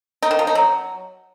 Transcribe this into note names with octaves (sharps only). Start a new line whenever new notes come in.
D#4
D#3
F3
D#4
F#3